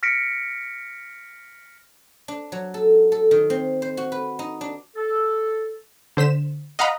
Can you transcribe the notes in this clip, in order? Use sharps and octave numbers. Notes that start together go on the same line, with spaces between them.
F6 A#6 B6 C#7 D7
D4
F#3
A4
A4
D#3
C4
C5
F#4
B4
D#4
D4
A4
D3 C5 B6 E7
D#5 F5 F#5 A#5 B5